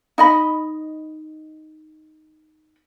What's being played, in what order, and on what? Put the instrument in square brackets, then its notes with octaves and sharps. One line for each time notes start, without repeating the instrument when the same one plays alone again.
[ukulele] D#4 D#5 B5